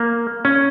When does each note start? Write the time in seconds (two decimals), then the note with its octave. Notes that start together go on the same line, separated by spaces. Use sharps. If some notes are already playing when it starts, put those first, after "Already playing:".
Already playing: A#3
0.45 C#4